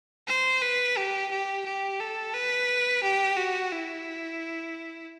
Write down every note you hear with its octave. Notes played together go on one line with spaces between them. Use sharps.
C5
B4
G4
G4
G4
A4
B4
G4
F#4
E4